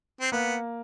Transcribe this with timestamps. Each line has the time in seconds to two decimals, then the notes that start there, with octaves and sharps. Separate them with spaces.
0.21 C4
0.32 A#3 B3